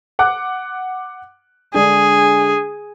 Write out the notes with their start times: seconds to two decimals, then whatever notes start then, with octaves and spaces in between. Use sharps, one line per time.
0.19 F#5 D6 F#6
1.74 D3 G#3 D4 G#4